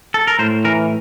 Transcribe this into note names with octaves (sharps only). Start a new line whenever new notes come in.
A4
A#4
A2 C5
E3 A#4